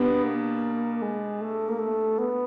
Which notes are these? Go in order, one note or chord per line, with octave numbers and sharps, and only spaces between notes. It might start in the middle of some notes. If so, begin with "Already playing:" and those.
Already playing: B2 G3 B3 D4
A#3
G#3
A3
A#3
A3
B3